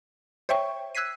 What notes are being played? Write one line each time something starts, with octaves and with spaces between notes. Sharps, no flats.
C5 C#5 E5 G5 C#6
E6 F#6 G#6 B6 C7 D#7